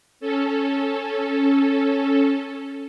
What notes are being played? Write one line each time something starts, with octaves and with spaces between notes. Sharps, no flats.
C#4 A4